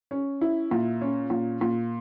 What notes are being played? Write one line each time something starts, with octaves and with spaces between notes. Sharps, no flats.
C#4
E4
A#2
C#4
A#2
A#2